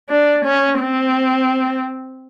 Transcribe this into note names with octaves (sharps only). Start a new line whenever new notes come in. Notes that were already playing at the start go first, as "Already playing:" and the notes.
D4
C#4
C4